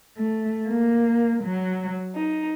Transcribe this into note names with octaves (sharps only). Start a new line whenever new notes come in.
A3
A#3
F#3
D#4